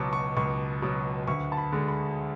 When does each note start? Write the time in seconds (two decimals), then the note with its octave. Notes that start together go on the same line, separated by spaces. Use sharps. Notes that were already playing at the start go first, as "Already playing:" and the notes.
Already playing: C#2 B2 F#3 A5 C#6 D6
0.13 C#6
0.37 C#2 C#6
0.82 B2 F#3
1.27 D2 C#6
1.52 A5
1.57 B5
1.72 D3 G#3
1.88 B5